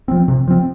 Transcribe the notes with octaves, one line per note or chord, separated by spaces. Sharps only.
F3 C4
C3
F3 C4